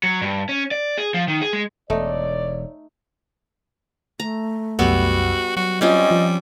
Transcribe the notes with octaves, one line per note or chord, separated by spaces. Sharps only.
F#3
G2
C#4
D5
G#4
F3
D#3
G#4
G#3
E1 A3 D#4 C#5 D5
A3 A#5
C2 F#2 G3 B3 F#4 E6
F#3 F#4
G3 C4 C#4 F4 D#5
F3